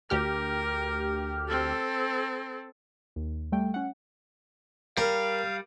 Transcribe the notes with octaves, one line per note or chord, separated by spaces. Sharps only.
D2 G4 A#4 F6
C4 A4
D#2
G3 A3 G5
C#4 F#5
G3 A#4 F5